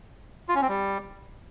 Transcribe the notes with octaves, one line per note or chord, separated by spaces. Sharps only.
F4
C#4
C4
G3